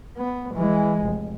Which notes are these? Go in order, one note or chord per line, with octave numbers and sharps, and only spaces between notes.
B3
E3 G#3
F1